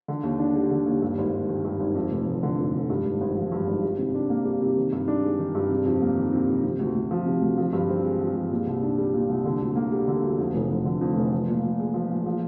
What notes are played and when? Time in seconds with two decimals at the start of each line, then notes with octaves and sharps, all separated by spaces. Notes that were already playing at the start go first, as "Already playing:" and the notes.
0.08 D3
0.23 D#2
0.39 D4
0.55 G3
0.71 D3
0.86 D#2
1.02 G2
1.18 G#1
1.33 G#1
1.49 D#3
1.65 G2
1.80 G#1
1.95 F2
2.11 F1
2.27 F1
2.43 D3
2.58 F2
2.74 F1
2.90 G2
3.05 G#1
3.21 G#1
3.36 F3
3.52 G2
3.67 G#1
3.84 G3
3.99 C3
4.15 D4
4.30 A#3
4.45 G3
4.61 C3
4.77 D#3
4.92 G2
5.08 D4
5.24 G#3
5.39 D#3
5.55 G2
5.70 C3
5.85 F2
6.02 A#3
6.17 D#3
6.33 C3
6.48 F2
6.64 C3
6.80 D2
6.95 D2
7.11 F3
7.26 C3
7.42 D2
7.58 F3
7.73 G2
7.89 C4
8.05 G#3
8.19 F3
8.35 G2
8.51 A#2
8.67 C2
8.82 D4
8.98 G3
9.13 A#2
9.30 C2
9.45 D3
9.61 D2
9.75 A#3
9.92 G3
10.08 D3
10.23 D2
10.38 F2
10.54 F1
10.70 F1
10.85 D3
11.01 F2
11.17 F1
11.32 F3
11.48 A#2
11.63 A#2
11.79 G#3
11.94 F3
12.11 A#2
12.26 F3